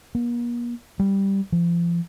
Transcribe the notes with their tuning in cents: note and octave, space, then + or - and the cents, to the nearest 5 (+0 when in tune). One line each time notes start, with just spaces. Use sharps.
A#3 +45
G3 +0
F3 -35